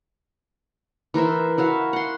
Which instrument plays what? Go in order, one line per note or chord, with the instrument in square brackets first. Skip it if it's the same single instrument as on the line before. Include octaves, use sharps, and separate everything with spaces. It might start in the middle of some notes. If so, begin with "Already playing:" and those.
[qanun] E3 A#4 C5 E5
E4 F#4 E5 F5
F#5 C6